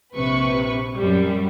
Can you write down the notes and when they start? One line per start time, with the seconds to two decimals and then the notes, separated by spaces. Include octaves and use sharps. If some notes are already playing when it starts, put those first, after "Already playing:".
0.15 A#1 C3 B4 C#6
0.96 F#2 G3